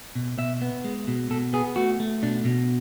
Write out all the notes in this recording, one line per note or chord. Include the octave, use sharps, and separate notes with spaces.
B2
B2 E5
B3
G#3
B2
B2 A4
B3 G#4
A3 F#4
A3
B2 D4
B2